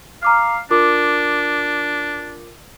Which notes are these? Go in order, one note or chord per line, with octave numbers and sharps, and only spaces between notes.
F5 A#5 D6 F6
D4 F4 A#4 D6